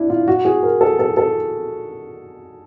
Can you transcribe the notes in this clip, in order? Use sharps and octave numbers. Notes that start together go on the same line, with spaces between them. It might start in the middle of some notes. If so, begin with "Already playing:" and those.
Already playing: D4 E4
F4
F#4
G#4
A#4
A4
A4
A4